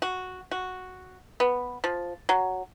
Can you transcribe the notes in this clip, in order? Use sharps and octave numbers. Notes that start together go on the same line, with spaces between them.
F#4
F#4
B3
F3
F#3